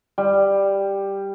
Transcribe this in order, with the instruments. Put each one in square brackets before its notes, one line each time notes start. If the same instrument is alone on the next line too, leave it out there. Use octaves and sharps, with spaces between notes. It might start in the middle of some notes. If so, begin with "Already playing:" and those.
[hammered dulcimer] G3